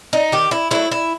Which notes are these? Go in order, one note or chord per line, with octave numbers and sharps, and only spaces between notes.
D#4
D#3 G4
E4
F#3 A3 E4
E4